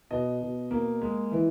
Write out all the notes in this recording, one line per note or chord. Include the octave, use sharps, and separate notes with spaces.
B2 D#5
B2
A#3
G#3
E3